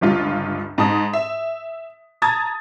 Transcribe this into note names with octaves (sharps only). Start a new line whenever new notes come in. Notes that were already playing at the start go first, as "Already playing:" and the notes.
G1 C#2 G2 F4
G#2 A5 D#6
E5
A5 A#5 D#6 G#6 A6